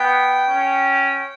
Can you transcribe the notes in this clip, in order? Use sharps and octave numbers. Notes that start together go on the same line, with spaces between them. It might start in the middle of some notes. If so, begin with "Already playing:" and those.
Already playing: B3 G5
C#4